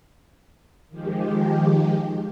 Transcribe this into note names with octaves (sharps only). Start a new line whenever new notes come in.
D#3 F3 G#3 G4